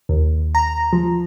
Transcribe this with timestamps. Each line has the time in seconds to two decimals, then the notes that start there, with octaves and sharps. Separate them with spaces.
0.09 D#2
0.55 A#5
0.93 F3